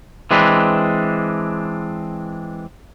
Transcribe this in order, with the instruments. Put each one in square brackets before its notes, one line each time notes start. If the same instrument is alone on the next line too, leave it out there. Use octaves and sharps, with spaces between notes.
[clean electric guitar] E3 G#3 C4 D4 B4